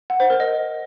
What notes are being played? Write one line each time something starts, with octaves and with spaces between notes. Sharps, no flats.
F#5
C5
A#4
D#5